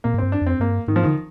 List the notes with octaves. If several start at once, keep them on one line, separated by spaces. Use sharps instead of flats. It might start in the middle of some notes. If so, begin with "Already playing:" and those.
A#2 A#3
G#2
G2 C4
D4
F2 C4
G2 A#3
G#2 D#3
F3
D3 D#3